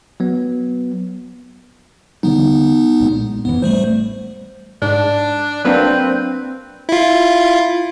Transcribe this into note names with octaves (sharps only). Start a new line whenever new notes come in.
F#3 B3
D3 E3 G3 B3 D#4
B1 A#2 G#3
F#1 F2 E3 B3
D1 A1 G3 A3 C5
G#2 D4
F#3 A#3 C4 D4 B4
E4 F4